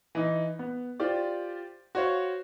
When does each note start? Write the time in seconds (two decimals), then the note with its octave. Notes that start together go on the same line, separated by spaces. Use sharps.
0.15 E3 D#4
0.59 B3
1.00 F4 G4 C5 D5
1.95 F#4 C5 C#5 F5